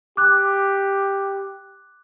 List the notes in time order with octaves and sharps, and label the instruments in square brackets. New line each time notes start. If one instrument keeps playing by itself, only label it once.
[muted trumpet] G4 [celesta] D6 F#6